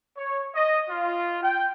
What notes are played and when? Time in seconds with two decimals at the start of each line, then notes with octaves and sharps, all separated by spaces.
0.17 C#5
0.54 D#5
0.89 F4
1.42 G5